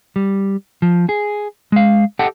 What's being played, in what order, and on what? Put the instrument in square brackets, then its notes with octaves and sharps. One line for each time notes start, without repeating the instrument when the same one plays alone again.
[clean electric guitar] G3
F3
G#4
G#3 F5
G4 A4 D#5 F#5 G5 A5